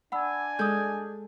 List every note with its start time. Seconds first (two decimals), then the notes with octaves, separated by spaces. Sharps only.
0.12 D4 D5 F#5 G#5 B5 E6
0.59 G#3 A4 D#6 G6